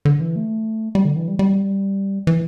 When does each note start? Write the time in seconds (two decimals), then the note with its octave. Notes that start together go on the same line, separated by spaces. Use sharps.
0.05 D3
0.20 E3
0.36 A3
0.95 G3
1.05 D3
1.16 E3
1.28 G3
1.39 G3
2.27 E3